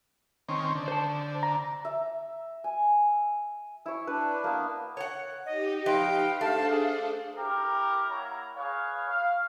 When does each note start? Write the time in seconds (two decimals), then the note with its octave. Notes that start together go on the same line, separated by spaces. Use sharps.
0.48 D#3 C4 C#4
0.75 D3
0.88 C5 A5
1.43 A#5
1.85 E5
2.64 G#5
3.86 E4 C#5
4.07 D4 B4
4.44 A#3 B3
4.97 C#5 F#5
5.46 D#4 G4 D#5
5.86 F3 B4 D#5 F5 G5
6.41 A3 D4 A4 C5 A5
6.69 G#4
7.37 E4 G4 A#4
8.10 A#3 E4 C#5 F#5 A#5
8.56 G#4 B4 C#5 F5
9.09 F5